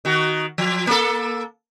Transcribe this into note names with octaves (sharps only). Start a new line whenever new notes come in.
D#3 F#4
F3
A#3 A4